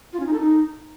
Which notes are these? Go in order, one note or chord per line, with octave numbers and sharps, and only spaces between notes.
F4
C#4
D#4
A4
D#4